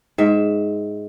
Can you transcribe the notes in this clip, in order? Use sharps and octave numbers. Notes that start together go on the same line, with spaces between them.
G#2 E5